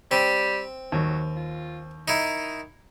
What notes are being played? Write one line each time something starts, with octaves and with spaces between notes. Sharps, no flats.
G3 C4
D#2 F#3
F4
D#3 D#4 E4